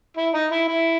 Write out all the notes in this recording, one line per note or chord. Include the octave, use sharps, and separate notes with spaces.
E4
D#4
E4
E4